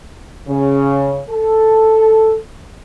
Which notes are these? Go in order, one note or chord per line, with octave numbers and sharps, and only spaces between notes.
C#3
A4